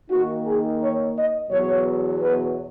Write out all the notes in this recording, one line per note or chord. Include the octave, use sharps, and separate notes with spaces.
D#3 A#3 D#4 F#4
G#4
C#5
D#5
E2 B2 F#3 C#5
B4